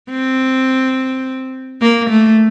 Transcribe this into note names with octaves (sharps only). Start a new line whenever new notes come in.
C4
A#3
A3